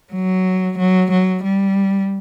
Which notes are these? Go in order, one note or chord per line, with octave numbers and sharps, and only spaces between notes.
F#3
F#3
F#3
G3